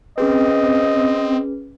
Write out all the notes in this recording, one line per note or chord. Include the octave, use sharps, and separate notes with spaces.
C4 C#4 G#4 B4 D#5